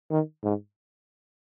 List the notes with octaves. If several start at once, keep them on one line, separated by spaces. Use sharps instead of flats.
D#3
G#2